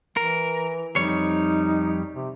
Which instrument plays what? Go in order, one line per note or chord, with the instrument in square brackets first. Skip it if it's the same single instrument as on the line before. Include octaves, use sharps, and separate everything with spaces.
[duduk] E3 [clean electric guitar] A#4
[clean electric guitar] F2 G3 C#5 [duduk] D#4
[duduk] C3